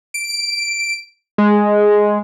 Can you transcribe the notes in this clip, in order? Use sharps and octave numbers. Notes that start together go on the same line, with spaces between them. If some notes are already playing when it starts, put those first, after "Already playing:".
D7
G#3